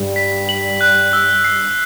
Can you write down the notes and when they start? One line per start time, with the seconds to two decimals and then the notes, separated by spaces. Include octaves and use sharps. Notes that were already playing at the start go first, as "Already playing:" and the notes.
Already playing: G2 G3
0.16 B6
0.49 F#7
0.81 F#6
1.13 E6
1.44 C7